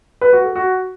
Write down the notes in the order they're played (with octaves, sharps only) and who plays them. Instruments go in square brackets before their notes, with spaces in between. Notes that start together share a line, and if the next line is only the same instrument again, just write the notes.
[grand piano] B4
F#4
A4
F#4